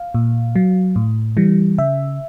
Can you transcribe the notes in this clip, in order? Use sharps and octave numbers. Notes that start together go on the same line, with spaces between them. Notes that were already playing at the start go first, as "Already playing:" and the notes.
Already playing: F5
A#2
F#3
A2
E3 G3
C#3 E5